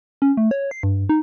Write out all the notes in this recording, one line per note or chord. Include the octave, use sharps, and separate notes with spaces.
C#4
A3
C#5
C7
G2
D#4